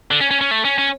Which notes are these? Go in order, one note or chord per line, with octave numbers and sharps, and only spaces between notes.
D3
C#4
C#4
C#4
A3
C#4
C#4